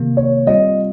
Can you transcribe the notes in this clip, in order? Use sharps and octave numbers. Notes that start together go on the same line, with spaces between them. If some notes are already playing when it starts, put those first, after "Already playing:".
Already playing: C3 D#3 A#3
C#5
G3 C4 F4 D#5